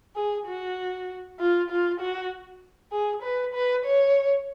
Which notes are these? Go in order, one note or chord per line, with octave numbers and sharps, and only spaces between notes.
G#4
F#4
F4
F4
F#4
G#4
B4
B4
C#5